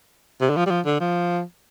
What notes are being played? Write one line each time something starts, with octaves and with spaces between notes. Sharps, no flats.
C3
D3
F3
G3
F3
D3
F3